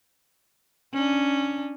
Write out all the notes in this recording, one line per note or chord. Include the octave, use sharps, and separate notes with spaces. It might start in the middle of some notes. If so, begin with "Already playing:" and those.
C#4 D4